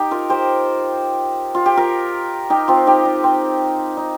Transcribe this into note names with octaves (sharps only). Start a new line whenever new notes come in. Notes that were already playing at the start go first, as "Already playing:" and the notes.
Already playing: D#4 G4
F4 A#4
G4 C5
F4
G4
F4 A#4
D#4 G4
C4 F4
D#4 G4
D#4
C4
D#4